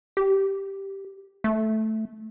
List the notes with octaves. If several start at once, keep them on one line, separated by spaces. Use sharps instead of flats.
G4
A3